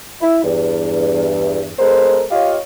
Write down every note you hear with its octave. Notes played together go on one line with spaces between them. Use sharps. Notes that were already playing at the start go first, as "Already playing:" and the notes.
E4
E2 G2
G#3 B3 A4 A#4 C5
F4 G4 C#5 D#5 F5